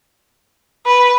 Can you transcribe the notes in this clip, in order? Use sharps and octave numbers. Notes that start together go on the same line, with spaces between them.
B4